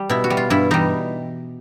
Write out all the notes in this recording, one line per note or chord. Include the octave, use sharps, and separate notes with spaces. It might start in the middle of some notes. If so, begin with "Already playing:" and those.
Already playing: G3
B2 E4
F#4
G3
F4
G2 E4
E3 G3 D#4